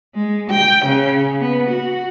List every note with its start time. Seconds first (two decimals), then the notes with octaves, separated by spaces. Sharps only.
0.15 G#3
0.50 G5
0.85 C#3
1.40 B3
1.70 F#4